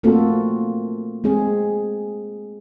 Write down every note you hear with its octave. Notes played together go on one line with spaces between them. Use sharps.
A3 A#3 C4 F4 F#4 A4
G#3 C4 G#4